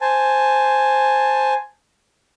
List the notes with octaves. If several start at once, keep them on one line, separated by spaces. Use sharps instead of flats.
C5 G#5 A5